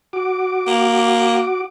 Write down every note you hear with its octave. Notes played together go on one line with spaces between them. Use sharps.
F#4 D6
A#3